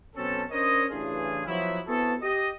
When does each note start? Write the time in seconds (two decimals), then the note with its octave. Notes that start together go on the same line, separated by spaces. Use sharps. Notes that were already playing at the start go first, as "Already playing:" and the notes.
0.16 B2 F#3 C4 C#4 A4
0.51 C#4 D4 A#4 C5 C#5 D#5
0.90 A1 C#3 E3 D4 F4 G#4
1.47 F3 F#3 B3 E4
1.87 B3 C4 E4 F#4 G#4 A4
2.22 G4 D#5